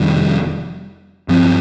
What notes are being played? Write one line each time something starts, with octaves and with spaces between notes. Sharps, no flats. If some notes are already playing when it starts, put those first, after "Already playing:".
Already playing: F1 F2 D#3 G3
G2 F3 C4